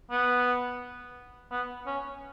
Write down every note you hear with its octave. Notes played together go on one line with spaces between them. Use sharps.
B3
B3
C#4